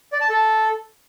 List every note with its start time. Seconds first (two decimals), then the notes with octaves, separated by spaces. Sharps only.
0.12 D5
0.21 A5
0.29 A4